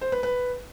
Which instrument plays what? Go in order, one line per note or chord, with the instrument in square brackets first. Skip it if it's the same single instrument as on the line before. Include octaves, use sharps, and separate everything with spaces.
[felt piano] C5
B4
B4